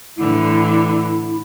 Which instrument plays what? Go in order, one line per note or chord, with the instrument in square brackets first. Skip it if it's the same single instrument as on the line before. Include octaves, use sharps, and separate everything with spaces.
[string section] A2 D3 E3 [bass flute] E4